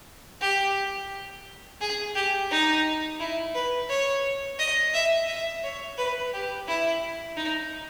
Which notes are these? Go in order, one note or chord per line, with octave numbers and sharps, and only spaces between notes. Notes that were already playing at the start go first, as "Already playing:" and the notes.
G4
G#4
G4
D#4
E4
B4
C#5
D#5
E5
E5
C#5
B4
G4
E4
D#4